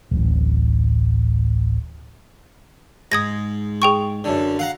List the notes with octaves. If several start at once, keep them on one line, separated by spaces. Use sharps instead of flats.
D1 A1
G#2 D#6 G#6 A#6
G#4 G5 C#6
F#2 D3
F5 F#5 A#5